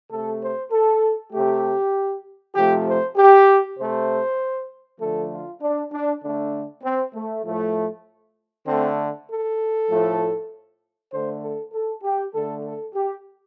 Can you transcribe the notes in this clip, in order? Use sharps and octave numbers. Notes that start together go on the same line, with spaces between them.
C3 A3 A4
C5
A4
C3 A3 G4
C3 F3 A3 G4
C5
G4
C3 A3 C5
D3 F3 A3 A4
F4
D4
D4
D3 A3 D4
C4
A3
A2 F3 A3
D3 A3 C4
A4
A2 F3 A3
D3 A3 C5
A4
A4
G4
D3 A3 A4
A4
G4